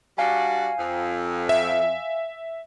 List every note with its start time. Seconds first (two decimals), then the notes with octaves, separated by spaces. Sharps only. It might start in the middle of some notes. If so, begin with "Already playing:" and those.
0.18 G3 D4 F#4 F5 G#5
0.78 F2
1.49 E5